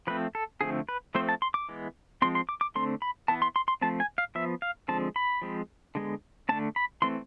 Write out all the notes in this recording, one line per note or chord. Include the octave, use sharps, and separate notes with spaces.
F3 A3 C4 B4
A4
D3 F3 A3 C4 G#4
B4
F3 A3 C4 C5
A5
C6
D6
E3 G#3 B3
F3 G#3 C4 C6
C6
D6
D6
D3 A3 C4 C6
B5
E3 B3 A5
C6
C6
C6
F3 A3 C4 A5
G#5
F5
F3 B3 E5
F5
D3 F3 G#3 C4 A5
B5
F3 G#3 C4
D3 G#3 B3
D3 A3 C4 A5
B5
E3 A3 C4 C6